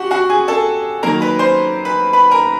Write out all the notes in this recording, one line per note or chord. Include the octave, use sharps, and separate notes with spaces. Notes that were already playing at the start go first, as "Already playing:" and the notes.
Already playing: F#4 G4 F#5
F#4 F#5
G#4 G#5
A4 A5
D#3 F#3 A#3 A#4 A#5
B4 B5
C5 C6
B4 B5
B4 B5
A#4 A#5